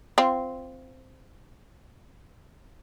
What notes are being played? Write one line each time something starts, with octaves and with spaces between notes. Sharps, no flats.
C4 F4